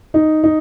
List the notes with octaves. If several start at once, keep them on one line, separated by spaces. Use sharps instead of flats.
D#4
D#4